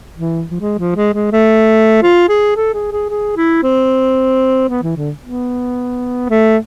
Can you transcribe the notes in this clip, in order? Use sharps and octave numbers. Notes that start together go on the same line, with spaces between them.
E3
F3
G#3
F3
G#3
G#3
A3
F4
G#4
A4
G#4
G#4
G#4
E4
C4
B3
E3
D3
B3
A3